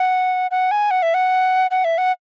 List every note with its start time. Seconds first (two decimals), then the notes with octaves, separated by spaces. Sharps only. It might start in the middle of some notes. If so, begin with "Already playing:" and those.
Already playing: F#5
0.51 F#5
0.71 G#5
0.91 F#5
1.03 E5
1.14 F#5
1.71 F#5
1.85 E5
1.98 F#5